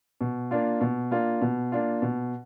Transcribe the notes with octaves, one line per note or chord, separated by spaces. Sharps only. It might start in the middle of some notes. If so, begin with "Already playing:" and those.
B2
A#3 D4 F4
B2
A#3 D4 F4
B2
A#3 D4 F4
B2